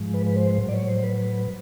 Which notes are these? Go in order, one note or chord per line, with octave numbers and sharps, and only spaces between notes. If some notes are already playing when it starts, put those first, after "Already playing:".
Already playing: G#2 F3 G#3
B4
B4
C5
A2 F#3
D5
C#5
C5
B4